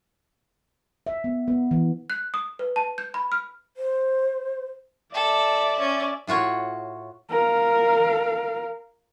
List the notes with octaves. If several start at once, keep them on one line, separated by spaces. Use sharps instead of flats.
E5
B3
B3
E3
F#6
D#6
B4
A5
G6
B5
F6
C5
A4 D5 E5
C#4
A2 F4 F#4 C#5
A#4 F5